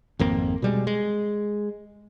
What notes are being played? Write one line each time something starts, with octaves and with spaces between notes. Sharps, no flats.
G#1 F2 A#3 C4
B2 G3 G#3
G#3